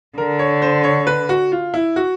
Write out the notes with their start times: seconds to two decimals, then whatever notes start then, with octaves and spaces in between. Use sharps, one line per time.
0.18 D3 A#4
0.39 C#5
0.62 C5
0.84 C#5
1.07 B4
1.29 F#4
1.52 F4
1.74 E4
1.96 F#4